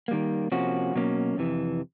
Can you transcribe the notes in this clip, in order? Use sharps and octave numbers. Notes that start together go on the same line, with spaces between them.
D#3 G3 A#3
C3 F3 A#3 C#4 F#4
B2 F#3 A#3 C#4
F2 C3 E3